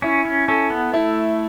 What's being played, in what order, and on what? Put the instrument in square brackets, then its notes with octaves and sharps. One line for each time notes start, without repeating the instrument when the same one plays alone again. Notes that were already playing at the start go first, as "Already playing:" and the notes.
[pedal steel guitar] C#4 [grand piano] E4
[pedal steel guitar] C#4
[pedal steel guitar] C#4 [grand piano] A4
[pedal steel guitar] B3
[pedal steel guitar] A3 [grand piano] E4